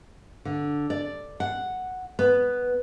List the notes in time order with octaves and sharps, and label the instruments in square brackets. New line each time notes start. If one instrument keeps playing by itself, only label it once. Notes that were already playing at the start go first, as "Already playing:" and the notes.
[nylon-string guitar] D3
D5
F#5
B3